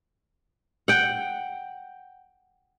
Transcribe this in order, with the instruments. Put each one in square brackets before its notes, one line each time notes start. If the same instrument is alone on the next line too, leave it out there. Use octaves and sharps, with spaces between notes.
[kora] F#5 G5